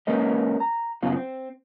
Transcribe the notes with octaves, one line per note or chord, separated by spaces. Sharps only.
G#3 A#3 C#4 B4 D#5
A#5
F#2 C#3 B3 F4
C4